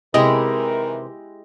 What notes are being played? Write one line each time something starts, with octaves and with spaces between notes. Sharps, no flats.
C3 D#3 E3 G#3 E4 G4 A#4 D#5